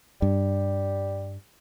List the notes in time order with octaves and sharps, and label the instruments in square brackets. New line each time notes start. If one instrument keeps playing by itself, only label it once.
[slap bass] G2 [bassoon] G3